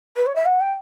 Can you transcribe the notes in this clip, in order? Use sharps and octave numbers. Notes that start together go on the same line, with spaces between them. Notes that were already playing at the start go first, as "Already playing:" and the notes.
B4
C#5
E5
F#5
G5